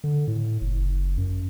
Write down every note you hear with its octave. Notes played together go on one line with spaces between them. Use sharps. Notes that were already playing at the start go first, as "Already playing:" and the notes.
D3
A2
F#1
F#2